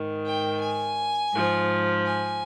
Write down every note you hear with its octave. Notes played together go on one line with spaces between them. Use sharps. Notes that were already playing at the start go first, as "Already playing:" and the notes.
Already playing: G#2 D#3
G5
G#5
G#2 F3
G#5